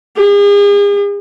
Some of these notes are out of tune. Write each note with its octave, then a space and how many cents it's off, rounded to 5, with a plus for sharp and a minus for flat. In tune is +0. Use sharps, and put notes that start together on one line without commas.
G#4 -40